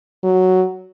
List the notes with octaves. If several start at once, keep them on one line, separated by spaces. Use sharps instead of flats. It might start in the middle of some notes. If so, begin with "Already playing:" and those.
F#3